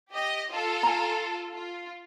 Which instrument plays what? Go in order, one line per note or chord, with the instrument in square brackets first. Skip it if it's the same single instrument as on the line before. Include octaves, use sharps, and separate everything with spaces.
[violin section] G4 D#5
F4 A4
[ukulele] G#5 A#5
[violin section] F4